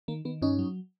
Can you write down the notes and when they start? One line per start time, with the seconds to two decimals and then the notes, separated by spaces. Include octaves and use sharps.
0.08 D#3 A#3
0.25 D#3 B3
0.42 G2 C#4 D#4
0.59 F#3